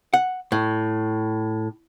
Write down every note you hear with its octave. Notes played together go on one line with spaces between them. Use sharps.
F#5
A2